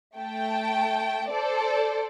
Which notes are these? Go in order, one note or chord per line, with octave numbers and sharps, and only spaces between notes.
A3 G5 A5
A4 C5 D5